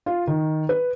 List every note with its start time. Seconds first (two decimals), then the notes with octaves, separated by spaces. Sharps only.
0.06 F4
0.27 D#3
0.69 B4